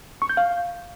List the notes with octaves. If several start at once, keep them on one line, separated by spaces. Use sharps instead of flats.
C#6
G6
F5